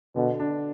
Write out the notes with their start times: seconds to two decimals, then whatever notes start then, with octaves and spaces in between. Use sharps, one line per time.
0.16 B2 D3
0.40 D4